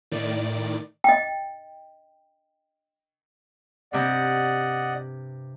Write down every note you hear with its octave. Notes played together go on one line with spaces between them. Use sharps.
A2 D#3 D5
D#5 G5
G2 C3 D5 D#5 F#5